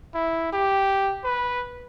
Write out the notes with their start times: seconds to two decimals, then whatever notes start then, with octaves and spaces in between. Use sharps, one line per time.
0.14 E4
0.53 G4
1.24 B4